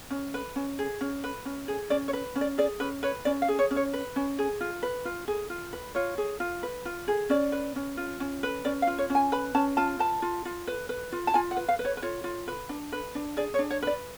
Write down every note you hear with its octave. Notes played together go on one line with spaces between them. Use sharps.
C#4
B4
C#4
G#4
C#4
B4
C#4
G#4
C#4 D5
C#5
B4
C#4
D5
G#4 D5
C#4 B4
B4 C#5
C#4 D5
F5
G#4
C#5
C#4
C#5
B4
C#4
G#4
F4
B4
F4
G#4
F4
B4
F4 C#5
G#4
F4
B4
F4
G#4
C#4 D5
B4
C#4
F4
C#4
B4
C#4 D5
F5
F4
C#5
C#4
G#5
B4 B5
C#4 A5
F4 A5
B4 A5
F4
F4
B4
B4
F4
A5
F4 G#5
F#5
B4
F5
B4
C#5
B4
F4 C#5
F4
B4
D4
B4
D4
G#4 D5
C#5
D4
C#5
B4 D5